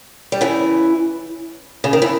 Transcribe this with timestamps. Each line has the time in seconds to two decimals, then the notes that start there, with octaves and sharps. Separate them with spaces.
0.32 G3
0.41 C#3 E3
1.84 C#3
1.93 D#3
2.02 E3